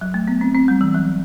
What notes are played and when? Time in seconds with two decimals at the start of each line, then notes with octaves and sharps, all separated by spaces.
0.01 F#3
0.14 A3
0.28 B3
0.41 C4
0.55 C4
0.68 G3
0.81 E3
0.95 F#3